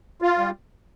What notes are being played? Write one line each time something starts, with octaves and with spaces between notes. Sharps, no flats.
F4
G3